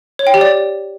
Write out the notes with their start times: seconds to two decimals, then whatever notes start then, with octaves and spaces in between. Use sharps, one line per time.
0.19 C#5
0.27 G5
0.34 G4
0.41 D5